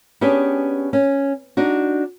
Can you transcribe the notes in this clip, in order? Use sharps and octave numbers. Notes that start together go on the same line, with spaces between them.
B3 C#4 D4 G4 G#4
C#4
D4 D#4 F#4